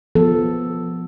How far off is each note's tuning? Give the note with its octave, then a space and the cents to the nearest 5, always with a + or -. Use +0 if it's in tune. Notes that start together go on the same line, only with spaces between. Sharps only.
F3 +0 B3 +0 A4 +0